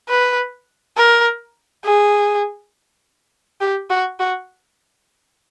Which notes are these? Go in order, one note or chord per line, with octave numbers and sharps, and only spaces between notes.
B4
A#4
G#4
G4
F#4
F#4